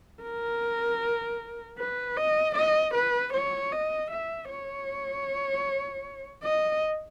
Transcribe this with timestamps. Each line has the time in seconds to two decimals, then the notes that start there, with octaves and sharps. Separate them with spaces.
0.23 A#4
1.78 B4
2.17 D#5
2.55 D#5
2.95 B4
3.34 C#5
3.72 D#5
4.11 E5
4.50 C#5
6.43 D#5